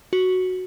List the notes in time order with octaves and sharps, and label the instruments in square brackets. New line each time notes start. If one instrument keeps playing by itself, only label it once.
[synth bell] F#4